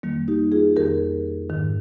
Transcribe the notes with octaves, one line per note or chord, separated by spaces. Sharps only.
F2 D#3 G3 A#3
D#4 G4
F4 G#4
F2 D#3 G4 A#4
G#2 D#3